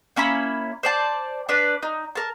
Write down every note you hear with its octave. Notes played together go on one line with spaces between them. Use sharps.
A#3 C#4 E4 B5
C5 D5 A5
D4 B4 D5
D#4
A#4 A5